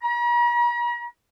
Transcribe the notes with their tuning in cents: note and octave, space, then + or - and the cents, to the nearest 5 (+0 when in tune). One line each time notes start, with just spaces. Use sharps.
A#5 +45